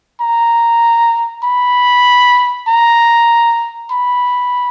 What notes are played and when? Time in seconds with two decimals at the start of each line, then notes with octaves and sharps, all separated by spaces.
0.21 A#5
1.44 B5
2.68 A#5
3.91 B5